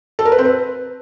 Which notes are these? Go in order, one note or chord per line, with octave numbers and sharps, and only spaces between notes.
A4
A#4
B4
C4
B4